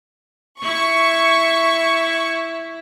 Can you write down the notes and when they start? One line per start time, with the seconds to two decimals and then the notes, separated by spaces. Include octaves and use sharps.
0.62 E4 C#6